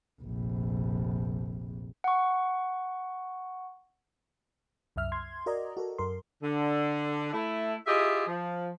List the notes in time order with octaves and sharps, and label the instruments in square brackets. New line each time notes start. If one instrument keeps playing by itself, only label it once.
[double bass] F1 A#1
[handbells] F#5 C#6
[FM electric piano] C2 F#2 E5 F6
C6 G#6
F#4 A#4 D5 D#5 A#5
F#4 A4 A#4
F#2 A#4 C6
[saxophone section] D3
A3 E4
E4 F4 G4 G#4 D#5 E5
F3